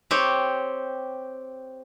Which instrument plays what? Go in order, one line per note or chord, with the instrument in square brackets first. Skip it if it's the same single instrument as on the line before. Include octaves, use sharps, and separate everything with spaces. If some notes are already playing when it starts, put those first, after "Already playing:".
[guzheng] C4 G4 C#5